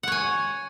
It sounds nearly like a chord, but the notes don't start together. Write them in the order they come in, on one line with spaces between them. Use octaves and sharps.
F#5 C#5 G#5